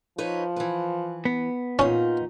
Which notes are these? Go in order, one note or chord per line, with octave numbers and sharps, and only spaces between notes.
F3 D#4 B4 C#5
E3 B4
B3
A#2 C#4 D#4 F4